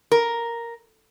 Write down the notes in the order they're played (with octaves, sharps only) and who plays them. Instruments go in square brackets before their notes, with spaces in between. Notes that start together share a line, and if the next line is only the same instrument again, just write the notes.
[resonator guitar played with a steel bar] A#4